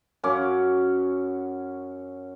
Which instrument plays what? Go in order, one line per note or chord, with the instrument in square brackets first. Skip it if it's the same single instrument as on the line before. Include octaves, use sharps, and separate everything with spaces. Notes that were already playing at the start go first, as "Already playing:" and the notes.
[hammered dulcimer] F#2 C#4 D6